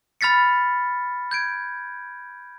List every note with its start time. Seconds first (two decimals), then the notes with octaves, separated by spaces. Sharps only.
0.21 B5 F6 A6 B6 C#7
1.31 G6 G#6 D7